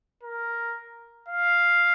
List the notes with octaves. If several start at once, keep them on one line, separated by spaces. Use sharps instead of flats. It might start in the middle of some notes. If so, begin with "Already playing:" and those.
A#4
F5